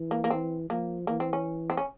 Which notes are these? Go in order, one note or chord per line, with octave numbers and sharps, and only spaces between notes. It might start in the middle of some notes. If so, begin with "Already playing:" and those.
Already playing: E3
A#3
A#3
E3 C4
F3 A#3
E3 A#3
C4
C#4
C4
C#4